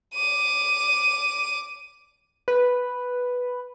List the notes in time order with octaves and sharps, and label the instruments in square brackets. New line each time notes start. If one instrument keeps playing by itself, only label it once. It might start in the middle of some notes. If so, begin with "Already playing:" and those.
[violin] D6 D#7
[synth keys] B4